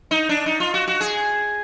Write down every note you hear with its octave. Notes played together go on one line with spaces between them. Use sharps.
D#4
D4
D#4
F4
F#4
F#4
G#4